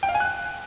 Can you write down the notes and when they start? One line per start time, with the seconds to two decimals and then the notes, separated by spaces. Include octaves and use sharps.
0.03 G5
0.09 F5
0.14 G#5
0.20 F#6